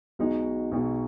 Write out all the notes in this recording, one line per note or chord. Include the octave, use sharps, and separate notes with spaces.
B1 B2 G#3 D#4
B1 B2 G#3 D#4